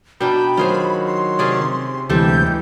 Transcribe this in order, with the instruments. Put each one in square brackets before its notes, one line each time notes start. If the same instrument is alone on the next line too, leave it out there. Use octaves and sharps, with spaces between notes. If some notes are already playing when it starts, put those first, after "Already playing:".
[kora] B2 D4 D#4 [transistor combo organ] G5 [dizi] B5
[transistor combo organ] D#3 F#3 [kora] F4 G#4 C5
[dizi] C6
[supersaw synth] C3 [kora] C#4 G#4 D5
[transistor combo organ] D2 C3 [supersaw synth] E3 G#3 [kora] G3 G4 A4 [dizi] G6